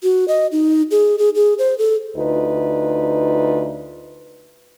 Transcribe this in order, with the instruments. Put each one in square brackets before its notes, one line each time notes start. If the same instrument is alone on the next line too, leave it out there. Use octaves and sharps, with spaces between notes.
[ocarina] F#4
D#5
D#4
G#4
G#4
G#4
C5
A4
[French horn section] D2 D#4 F4 B4